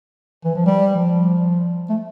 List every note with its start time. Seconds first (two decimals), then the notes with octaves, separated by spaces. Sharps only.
0.45 E3
0.55 F3
0.66 G3
0.96 F3
1.89 A3